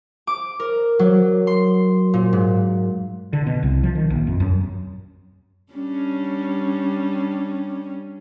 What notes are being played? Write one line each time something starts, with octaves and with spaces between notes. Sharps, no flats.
D6
A#4
F#3
C6
A#2
G#2
D3
B2
C2
F3
D#3
A#1
F2
F#2
G3 C#4 D4